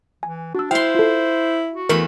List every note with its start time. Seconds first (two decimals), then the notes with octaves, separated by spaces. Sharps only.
0.23 E3 G#5
0.55 D4 F#4 E6
0.71 E4 C5 F5 G5 C6
0.95 F4 A4
1.72 F#4
1.89 E2 A3 A#4 B5